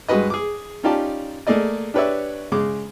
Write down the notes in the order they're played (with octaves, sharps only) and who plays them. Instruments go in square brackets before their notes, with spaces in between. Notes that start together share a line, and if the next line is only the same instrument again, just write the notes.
[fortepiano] G2 G#3 F#4 B4 D#5
G#4 D6
C#4 D#4 F4 G4 D5 A5
A3 A#3 G#4 D5 D#5
D4 G4 B4 C#5 D5 E5
C#3 G#3 D6